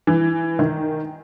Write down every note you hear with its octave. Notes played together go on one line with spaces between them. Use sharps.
E3
D#3